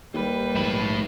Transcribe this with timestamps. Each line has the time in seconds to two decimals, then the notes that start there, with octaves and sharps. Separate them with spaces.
0.14 D#2 G3 B4
0.56 A#1 G#2 A3 B5